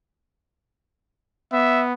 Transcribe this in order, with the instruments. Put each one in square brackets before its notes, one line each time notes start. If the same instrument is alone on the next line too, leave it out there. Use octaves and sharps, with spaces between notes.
[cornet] B3 [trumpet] E5